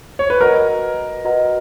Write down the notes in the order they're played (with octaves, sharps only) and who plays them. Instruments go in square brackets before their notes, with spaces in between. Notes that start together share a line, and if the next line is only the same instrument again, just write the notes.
[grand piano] C#5
B4
[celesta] F#4 B4 D#5 F#5 A#5 [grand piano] A#4
[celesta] F#4 B4 D#5 F#5 A#5